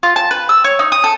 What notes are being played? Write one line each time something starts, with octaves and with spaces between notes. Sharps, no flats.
F4
A5
B4
E6
C#5
D#4
D#6
A4